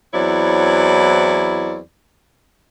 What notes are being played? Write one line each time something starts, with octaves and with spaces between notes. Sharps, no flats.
E2 F#3 C4 E4 C#5 D5